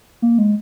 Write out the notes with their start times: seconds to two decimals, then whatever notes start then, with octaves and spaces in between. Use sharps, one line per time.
0.22 A#3
0.38 G#3